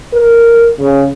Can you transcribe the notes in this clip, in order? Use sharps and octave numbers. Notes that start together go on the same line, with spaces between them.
A#4
C#3